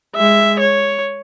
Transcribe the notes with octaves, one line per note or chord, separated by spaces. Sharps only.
G#3 E5
C#5